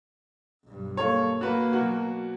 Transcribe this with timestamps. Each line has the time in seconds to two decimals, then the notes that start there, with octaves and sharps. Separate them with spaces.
0.65 B1 G2
0.97 A#3 A4 C#5
1.41 A#3 F#4 B4
1.72 B2 F#3 F#4